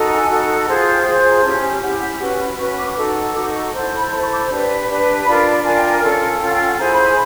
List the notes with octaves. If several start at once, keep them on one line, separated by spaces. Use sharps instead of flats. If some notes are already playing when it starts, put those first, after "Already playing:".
Already playing: D#4 F#4 A4
G#5
D#4 F#4 A4
F4 G#4 C5 A5
G#5
G5
F4 G#4 C5 G5
G#5
A#5
C#4 E4 G4 A5
G#5
C#4 E4 G4 F#5
F#5
C#4 F#4 B4 G#5
B5
C#4 F#4 B4 C#6
D6
C#6
D#4 F#4 A4 D6
D#4 F#4 A4 D6
C#6
E4 A4 C5 A#5
B5
E4 A4 C5 C6
C#6
D6
D4 G4 B4
D4 G4 B4
D4 F4 A#4 B5
A5
D4 F4 A#4 G#5
G5
G#5
C#4 F4 A4
C#4 F4 A4 G5
F#5
G5
F#5
E4 G#4 C5 A#5
B5
B5